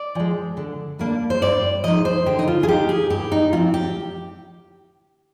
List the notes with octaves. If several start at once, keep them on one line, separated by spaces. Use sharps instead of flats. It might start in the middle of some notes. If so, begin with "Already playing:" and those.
Already playing: D5
F3 G#3
D3
G3 A#3 D4
C5
G2 D5
F3 G#3 D#4 D#5
C5
D3 G4
D#4
F4
G#4
G#3 D#4 G4
G#4
G2 G4
D#4
F3 C4 D#4 F4
G4